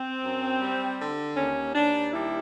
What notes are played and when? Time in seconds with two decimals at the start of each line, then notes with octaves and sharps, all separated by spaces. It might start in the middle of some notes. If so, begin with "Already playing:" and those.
Already playing: C4
0.23 F#2
0.60 G3
0.99 D3
1.36 D#2 C#4
1.74 D#2 D4
2.13 G3 E4